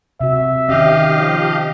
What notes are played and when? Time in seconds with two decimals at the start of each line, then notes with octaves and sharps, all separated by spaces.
0.21 C3 F#4 E5
0.68 D#3 C#4 G4 D#5 F5
1.18 F3